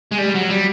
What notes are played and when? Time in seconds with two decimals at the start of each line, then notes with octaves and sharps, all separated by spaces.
0.11 G#3
0.18 G3
0.34 F#3
0.50 G3